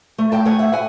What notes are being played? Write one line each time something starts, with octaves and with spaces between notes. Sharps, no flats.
A3
G5 A5
A3 F#5 G#5
E5 F#5
A2 F#5 G#5